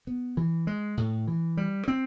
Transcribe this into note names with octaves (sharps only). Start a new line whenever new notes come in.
B3
E3
G#3
A2
E3
G3
C4